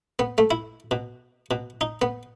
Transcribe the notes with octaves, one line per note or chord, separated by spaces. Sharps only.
B3
A3
E4
B2
B2
D#4
B3